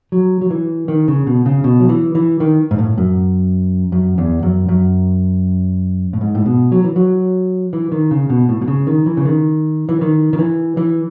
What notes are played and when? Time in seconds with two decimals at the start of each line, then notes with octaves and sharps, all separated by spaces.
0.12 F#3
0.41 F#3
0.51 E3
0.88 D#3
1.08 C#3
1.27 B2
1.46 C#3
1.64 B2
1.80 F#3
1.89 E3
2.15 E3
2.40 D#3
2.71 G#2
2.78 A2
2.98 F#2
3.92 F#2
4.18 E2
4.43 F#2
4.69 F#2
6.13 A2
6.21 G#2
6.35 A2
6.46 B2
6.72 F#3
6.84 E3
6.96 F#3
7.73 E3
7.92 D#3
8.11 C#3
8.30 B2
8.49 A2
8.62 B2
8.68 C#3
8.87 D#3
9.06 E3
9.17 C#3
9.25 D#3
9.89 E3
10.01 D#3
10.33 D#3
10.39 E3
10.77 E3